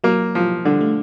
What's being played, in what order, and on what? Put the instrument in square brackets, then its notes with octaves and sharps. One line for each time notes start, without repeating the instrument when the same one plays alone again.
[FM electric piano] F#3 [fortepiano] A#3
[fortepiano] F3
[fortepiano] D3 [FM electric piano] G3
[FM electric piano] A3